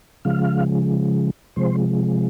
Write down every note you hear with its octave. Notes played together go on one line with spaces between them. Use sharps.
C#3 F3 G#3 F5
C3 F3 G#3 C5